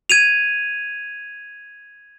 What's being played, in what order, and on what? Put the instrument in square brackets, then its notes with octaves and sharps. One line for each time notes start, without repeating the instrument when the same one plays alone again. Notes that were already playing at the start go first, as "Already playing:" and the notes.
[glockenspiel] G#6 D#7 F7